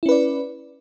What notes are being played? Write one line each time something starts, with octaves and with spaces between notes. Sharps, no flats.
C#4 E4 B4 D5